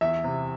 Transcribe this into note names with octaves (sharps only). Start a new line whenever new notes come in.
E2 E5
C3